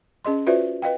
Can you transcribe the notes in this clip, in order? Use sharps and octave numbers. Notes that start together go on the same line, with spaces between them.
C#4 G#4 D#5 C6
F4 F#4 B4 C5 D5 E5
B4 D#5 F5 G5